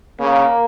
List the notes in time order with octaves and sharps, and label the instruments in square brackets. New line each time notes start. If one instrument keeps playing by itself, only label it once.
[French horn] C#3 [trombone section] A#3